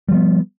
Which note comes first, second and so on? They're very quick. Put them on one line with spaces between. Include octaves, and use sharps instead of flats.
G3 F3 B3